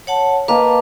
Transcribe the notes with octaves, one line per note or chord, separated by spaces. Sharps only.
C#5 F#5 A5
A#3 B4 D#5 F5 A5